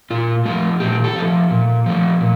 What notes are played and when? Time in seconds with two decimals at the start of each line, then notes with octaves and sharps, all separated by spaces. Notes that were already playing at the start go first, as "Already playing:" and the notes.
0.10 A#2 F4
0.45 F3 A3 F4
0.80 A#2 G4
1.04 A4
1.16 F3 A3
1.51 A#2
1.86 F3 A3
2.21 A#2